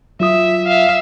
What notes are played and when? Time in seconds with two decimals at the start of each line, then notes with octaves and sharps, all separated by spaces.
0.20 F#3 F4 E5 D#6
0.66 E5 F5